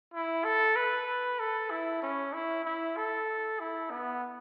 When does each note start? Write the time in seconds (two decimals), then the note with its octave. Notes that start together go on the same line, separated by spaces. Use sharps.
0.14 E4
0.45 A4
0.76 B4
1.40 A4
1.71 E4
2.02 C#4
2.33 E4
2.65 E4
2.97 A4
3.60 E4
3.91 B3